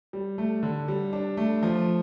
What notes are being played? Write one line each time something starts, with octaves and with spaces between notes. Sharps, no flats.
G3
A3
D3
G3
D4
A3
F3